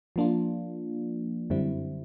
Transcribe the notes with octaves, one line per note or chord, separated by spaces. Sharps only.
F3 A#3 D4 F4
F#2 D3 G3 C4 E4